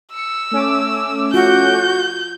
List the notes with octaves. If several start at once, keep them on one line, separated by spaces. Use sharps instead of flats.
E6 C#7
A3 C#4 D6
F4 F#4 G6